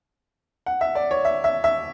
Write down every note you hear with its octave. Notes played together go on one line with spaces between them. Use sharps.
F#5
E5
D5
C#5
E5
E5
E5